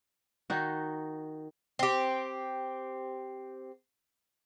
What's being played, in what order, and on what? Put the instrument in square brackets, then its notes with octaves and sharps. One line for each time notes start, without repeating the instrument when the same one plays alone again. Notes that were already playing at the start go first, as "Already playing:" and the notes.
[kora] D#3 D#4 F#4
[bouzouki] C4 G4